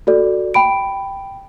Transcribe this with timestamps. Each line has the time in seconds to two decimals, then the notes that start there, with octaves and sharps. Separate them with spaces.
0.07 F#4 A4 D5
0.54 G5 B5 D7